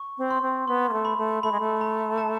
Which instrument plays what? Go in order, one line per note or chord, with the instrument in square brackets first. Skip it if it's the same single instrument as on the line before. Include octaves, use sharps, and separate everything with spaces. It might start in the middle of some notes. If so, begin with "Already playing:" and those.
Already playing: [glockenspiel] C#6
[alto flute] C4
[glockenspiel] C6
[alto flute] C4
[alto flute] B3 [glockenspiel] C6
[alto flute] A#3
A3
[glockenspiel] B5
[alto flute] A3
[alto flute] A3 [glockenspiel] B5
[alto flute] G#3
A3
[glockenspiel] A#5
A5